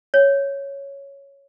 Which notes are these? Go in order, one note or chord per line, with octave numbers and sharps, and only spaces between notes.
C#5